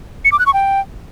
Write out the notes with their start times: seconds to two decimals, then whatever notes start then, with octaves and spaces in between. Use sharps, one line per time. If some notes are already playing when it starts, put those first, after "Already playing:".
0.25 C#7
0.32 D6
0.39 F#6
0.46 C#6
0.53 G5